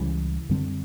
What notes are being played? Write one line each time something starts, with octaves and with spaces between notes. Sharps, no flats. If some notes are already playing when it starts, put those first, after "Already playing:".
Already playing: C#2 C#3 E3 G3
F#2 D3 G3 C4